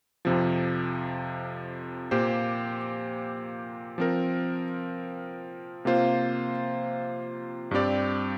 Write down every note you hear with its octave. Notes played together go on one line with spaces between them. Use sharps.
F2 C3 F3
A#2 A#3 G4 C5
F3 C4 A#4
C3 A#3 F4 C5
G2 G3 C4 G4 D5